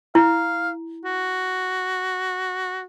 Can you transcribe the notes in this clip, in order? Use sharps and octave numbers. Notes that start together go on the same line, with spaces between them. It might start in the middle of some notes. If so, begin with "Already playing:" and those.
E4 F5
F#4